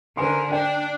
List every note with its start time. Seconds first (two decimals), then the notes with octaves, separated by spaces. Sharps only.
0.17 D3 A#4 C5 G#5 C6
0.52 D4 D5 G5